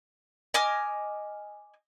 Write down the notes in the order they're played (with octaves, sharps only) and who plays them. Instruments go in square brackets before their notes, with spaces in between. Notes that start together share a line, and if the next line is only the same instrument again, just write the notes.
[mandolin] D#5 G#5 D6 F6